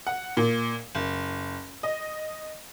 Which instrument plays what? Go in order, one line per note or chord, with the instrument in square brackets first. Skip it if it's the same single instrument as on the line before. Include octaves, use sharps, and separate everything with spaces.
[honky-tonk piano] F#5
A#2
F#1
D#5